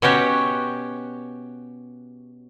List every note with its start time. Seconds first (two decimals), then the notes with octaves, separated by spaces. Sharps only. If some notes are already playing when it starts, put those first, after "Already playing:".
0.02 B2 C#4 F#4 G4 C#5